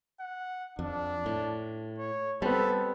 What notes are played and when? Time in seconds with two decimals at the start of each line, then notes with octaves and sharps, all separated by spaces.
0.20 F#5
0.79 F2 D4
1.26 A2
1.98 C#5
2.42 G3 B3 C4 A4